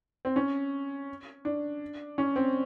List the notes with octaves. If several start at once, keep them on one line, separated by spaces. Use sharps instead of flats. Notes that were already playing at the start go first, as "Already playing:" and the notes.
C4
C#4
D4
C#4
C4